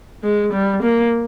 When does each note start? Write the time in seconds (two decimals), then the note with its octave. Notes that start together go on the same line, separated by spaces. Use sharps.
0.24 G#3
0.53 G3
0.83 A#3